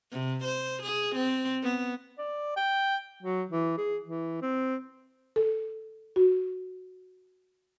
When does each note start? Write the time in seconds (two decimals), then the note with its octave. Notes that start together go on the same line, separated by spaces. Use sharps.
0.11 C3
0.44 C5
0.83 G#4
1.15 C4
1.63 B3
2.18 D5
2.56 G5
3.22 F#3
3.50 E3
3.78 G#4
4.04 E3
4.42 C4
5.36 A4
6.16 F#4